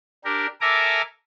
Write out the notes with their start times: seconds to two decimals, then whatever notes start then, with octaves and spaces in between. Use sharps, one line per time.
0.25 D4 G4 A#4
0.61 A4 A#4 E5 G#5 A#5 D6